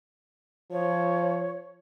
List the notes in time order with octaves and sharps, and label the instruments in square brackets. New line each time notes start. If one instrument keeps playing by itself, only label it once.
[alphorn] F3 [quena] C#5